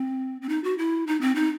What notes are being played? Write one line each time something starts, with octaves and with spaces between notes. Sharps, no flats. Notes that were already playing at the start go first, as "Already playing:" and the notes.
Already playing: C4
C4
D#4
F#4
E4
D#4
C4
D#4